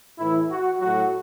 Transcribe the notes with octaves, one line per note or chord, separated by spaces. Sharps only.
A2 E3 E4
F#4
A2 F#3 F#4